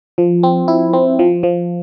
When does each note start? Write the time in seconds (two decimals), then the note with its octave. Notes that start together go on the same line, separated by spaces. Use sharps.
0.18 F3
0.43 C4
0.68 E4
0.93 C4
1.19 F3
1.43 F3